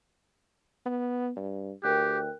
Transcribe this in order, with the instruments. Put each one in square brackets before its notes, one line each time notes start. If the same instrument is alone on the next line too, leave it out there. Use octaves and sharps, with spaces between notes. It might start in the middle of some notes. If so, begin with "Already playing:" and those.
[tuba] B3
G2
[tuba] D2 [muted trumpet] G4 [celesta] A#4 G5 F#6